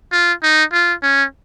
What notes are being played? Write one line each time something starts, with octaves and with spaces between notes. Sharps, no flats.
F4
D#4
F4
C#4